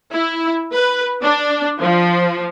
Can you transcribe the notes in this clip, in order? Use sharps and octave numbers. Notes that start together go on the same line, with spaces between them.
E4
B4
D4
F3